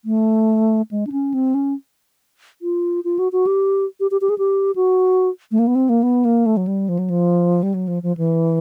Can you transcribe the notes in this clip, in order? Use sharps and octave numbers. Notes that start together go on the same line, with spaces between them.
A3
G#3
D4
C#4
C4
C#4
F4
F4
F#4
F#4
G4
G4
G4
G4
G#4
G4
F#4
A3
A#3
B3
C4
A#3
B3
A#3
A3
F#3
G3
F3
F#3
F3
G3
F#3
F3
F3
E3